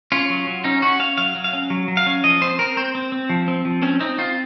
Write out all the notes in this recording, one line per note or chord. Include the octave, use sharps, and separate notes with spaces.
C#4 F4
F#3
F#3
C#4 D#4
C#4 F#4
C#4 F5
F#3 F5
F#3
F5
C#4
F#3
F#3
F5
C#4
F3 D#5
C4 C5
C4 A#4
C4 C5
C4
C4
F3
C4
F3
C4 C#4
C4 D#4
C4 F4